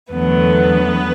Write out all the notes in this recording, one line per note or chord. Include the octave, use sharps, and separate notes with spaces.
E2 D3 F#3 A3 B3 B4